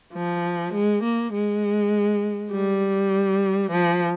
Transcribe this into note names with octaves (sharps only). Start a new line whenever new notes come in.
F3
G#3
A#3
G#3
G3
F3